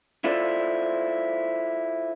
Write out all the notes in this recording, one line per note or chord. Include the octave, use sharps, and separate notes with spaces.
E4 F4 A4 C5 D5